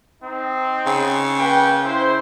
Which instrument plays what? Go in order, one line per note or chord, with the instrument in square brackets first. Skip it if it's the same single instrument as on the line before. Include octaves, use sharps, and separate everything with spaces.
[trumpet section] C4 D#4
[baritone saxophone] C#3
[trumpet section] A#3 B4 G5
E4 C5